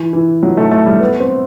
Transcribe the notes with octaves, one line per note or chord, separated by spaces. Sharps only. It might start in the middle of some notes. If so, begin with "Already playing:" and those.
Already playing: E3
E3
F#3
A3
A3
G3
B3
C4